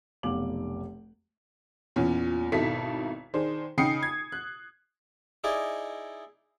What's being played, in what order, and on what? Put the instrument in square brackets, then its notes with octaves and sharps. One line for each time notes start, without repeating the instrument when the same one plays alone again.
[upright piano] F1 B1 F5 D6 F#7
[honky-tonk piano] E2 A#2 C#4
G#1 B2 D#4 E4 A4 B6
D#3 D4 G#4 C5
C#3 D#4 G5 D#6 C7 C#7
G#6
F#6
[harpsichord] D#4 E4 G#4 D5 D#5